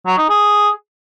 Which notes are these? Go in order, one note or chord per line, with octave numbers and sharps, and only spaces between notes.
F#3
D#4
G#4